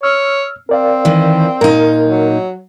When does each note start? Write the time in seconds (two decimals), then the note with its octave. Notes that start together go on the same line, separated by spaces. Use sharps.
0.03 C#5 E6 F6
0.69 C4 A#4 D5 F5
1.05 D#3 E3
1.61 A#2 D#4 A#4
2.07 F#3